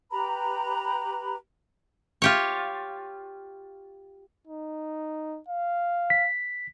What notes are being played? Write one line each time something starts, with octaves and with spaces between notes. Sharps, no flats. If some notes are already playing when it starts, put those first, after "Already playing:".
G4 B4 A#5 B5
F4 G4 C#5
D#4
F5
B6